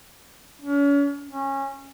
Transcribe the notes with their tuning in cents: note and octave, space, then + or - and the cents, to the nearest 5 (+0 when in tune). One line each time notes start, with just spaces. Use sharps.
C#4 +40
C#4 -20